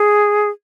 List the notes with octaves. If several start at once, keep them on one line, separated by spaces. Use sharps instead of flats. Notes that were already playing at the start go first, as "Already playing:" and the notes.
Already playing: G#4